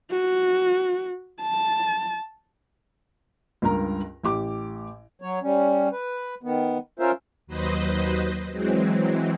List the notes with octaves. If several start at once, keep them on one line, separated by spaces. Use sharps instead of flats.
F#4
A5
C#2 G2 A#4 A#5
A1 G4 D6
F#3 C#5
G3 C#4
B4
D#3 B3
C#4 F4 A#4 C5 E5
D#2 F#3 B4 C5 D#5
E3 F#3 G#3 C4